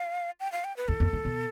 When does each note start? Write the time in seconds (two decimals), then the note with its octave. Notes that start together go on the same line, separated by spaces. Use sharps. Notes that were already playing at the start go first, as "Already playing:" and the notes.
Already playing: F5
0.40 G5
0.52 F5
0.64 G5
0.77 B4
0.88 E2 A4
1.00 F2
1.13 G2
1.25 B2